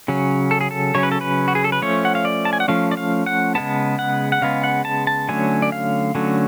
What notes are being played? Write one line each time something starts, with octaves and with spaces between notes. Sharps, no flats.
C#3 F#3 C#4
A4
G#4
A4
C#3 F#3 C#4 C#5
B4
A4
B4
F#4
G#4
A4
B4
F3 A3 C#4 C#5
F#5
F5
D5
A5
G#5
F#5
F3 A3 C#4 F5
D5
F5
F#5
C#3 G#3 B3 A5
F#5
F#5
C#3 G#3 B3 F5
F#5
A5
A5
D3 F#3 A3 C#4 G#5
D5
F5
D3 F#3 A3 C#4